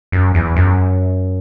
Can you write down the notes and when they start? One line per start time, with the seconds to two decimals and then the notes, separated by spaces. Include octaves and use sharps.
0.12 F#2
0.35 E2
0.56 F#2